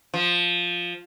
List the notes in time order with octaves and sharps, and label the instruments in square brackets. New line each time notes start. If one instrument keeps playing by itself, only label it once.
[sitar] F3